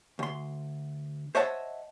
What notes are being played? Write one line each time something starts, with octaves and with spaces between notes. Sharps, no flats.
D2 C6
C5 C#5 D#5 E5 F#5 A5